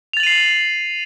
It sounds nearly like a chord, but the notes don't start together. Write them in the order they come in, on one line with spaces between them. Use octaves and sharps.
F7 A6 F#7 D#7 C7